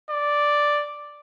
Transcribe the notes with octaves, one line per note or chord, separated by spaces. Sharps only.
D5